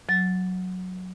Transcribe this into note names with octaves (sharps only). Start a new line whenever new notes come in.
F#3 A6